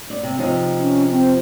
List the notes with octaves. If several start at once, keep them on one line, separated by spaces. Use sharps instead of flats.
D5
C3
C3 F3 D#4
C#4
C4